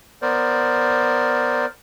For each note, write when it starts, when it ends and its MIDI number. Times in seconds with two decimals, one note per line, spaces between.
0.22 1.66 59
0.22 1.66 70
0.22 1.66 72
0.22 1.66 74